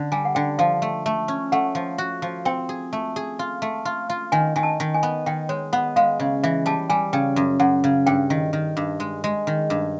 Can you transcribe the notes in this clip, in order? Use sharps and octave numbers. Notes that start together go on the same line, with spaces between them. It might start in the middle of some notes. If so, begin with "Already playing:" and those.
Already playing: D3
G3 G#5
F#5
D3 G5
F3 F5
A3
A3
C#4
A3 F#5
F3
F#4
F3
C4 G5
G#4
A3
G#4
F4
A3
F4
F4
D#3 G#5
D#3 G#5
A5
D#3
G#5
B3
D#3 G5
G#3 C#5
B3 F#5
G#3 F5
C#3
E3 E5
G3 A5
G3 G#5
C#3 G5
F#2
F#2 F#5
C#3
G2 G5
D#3
D#3
G2
G#3
G#3
D#3
G2